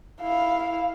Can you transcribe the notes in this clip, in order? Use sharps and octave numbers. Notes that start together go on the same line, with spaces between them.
E4 F5